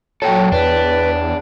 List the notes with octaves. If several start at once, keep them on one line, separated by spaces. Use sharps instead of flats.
A#2 F#3 A4 C#5 G5
E2 D4 B4